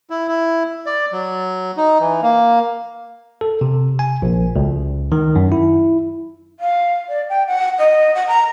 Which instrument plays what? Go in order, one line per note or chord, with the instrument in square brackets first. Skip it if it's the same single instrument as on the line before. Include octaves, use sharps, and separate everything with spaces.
[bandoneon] E4
E4
D5
F#3
D#4
E3
A#3
[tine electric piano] A4
C3
G#5
A#1
C#2
D#3
F#2
E4
[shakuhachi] F5
D5
G5
F#5
D#5
F#5
A#5